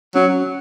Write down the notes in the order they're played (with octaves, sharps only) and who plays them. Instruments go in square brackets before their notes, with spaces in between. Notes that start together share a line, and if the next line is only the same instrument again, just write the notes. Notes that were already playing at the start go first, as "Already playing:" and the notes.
[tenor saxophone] F#3 [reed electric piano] C#4